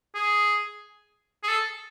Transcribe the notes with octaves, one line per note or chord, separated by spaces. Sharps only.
G#4
G#4
A4